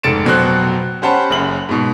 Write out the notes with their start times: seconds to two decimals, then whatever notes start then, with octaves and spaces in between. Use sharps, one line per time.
0.03 F1 G#2 A6 C#7 D7 E7
0.25 F1 B2 F#3 F#4 C5 F#6
1.02 C#4 G4 C5 F#5 A5 B5
1.30 F#1 F#2 F#7
1.69 G#2 B2